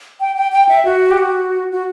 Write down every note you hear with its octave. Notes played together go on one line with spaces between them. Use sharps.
G5
G5
G5
E5
F#4
G4
F#4
F#4